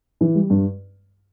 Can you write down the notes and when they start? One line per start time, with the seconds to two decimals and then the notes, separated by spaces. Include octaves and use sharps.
0.21 E3
0.35 G3
0.50 G2